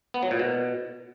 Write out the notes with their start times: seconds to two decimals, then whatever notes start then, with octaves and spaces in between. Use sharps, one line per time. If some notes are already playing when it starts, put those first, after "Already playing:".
0.14 B3
0.23 F#3
0.31 A#2
0.39 B2